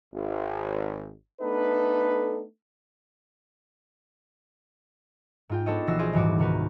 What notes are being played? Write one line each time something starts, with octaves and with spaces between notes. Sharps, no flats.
G#1
A3 B3 D4 D#4 A4 B4
G#2 F4 G5
B3 D4 A4 C5 C#5 D#5
A#1 E3 F#4 E6 A#6 C7
F4 G#4 C5 D5 D#5
D#1 G#2 E3 G3 F#4 D6
C2 D#3 F#4 A#4 B4